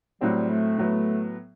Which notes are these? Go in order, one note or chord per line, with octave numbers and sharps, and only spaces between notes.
A2 F#3 G3 C4
A3
A2 F#3 B3